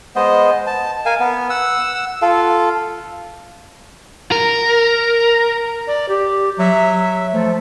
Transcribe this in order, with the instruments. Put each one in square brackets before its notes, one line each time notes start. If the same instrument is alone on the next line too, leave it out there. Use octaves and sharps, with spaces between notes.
[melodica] G#3 B3 C5 D#5
A5
A#4 F5 G#5
B3
F#5 E6
F4 A4 F5
[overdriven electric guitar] A#4
[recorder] D5
G4
[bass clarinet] F#3 [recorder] E5
[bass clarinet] F3 [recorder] A3